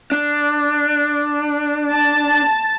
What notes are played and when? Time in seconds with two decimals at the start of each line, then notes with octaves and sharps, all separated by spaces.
0.12 D4
1.89 A5